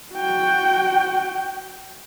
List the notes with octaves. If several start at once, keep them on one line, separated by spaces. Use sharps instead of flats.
F#4 G5